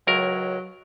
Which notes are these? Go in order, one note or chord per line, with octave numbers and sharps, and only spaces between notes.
C#2 F#3 A#4